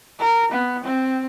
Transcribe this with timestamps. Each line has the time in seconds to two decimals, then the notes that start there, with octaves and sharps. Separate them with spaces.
0.19 A#4
0.52 B3
0.84 C4